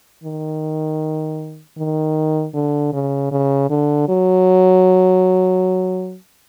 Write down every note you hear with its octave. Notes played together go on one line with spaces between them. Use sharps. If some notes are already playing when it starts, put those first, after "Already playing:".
D#3
D#3
D3
C#3
C#3
D3
F#3